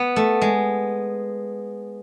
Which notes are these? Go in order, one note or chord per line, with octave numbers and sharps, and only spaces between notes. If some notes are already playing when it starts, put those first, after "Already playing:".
Already playing: B3
A3
G#3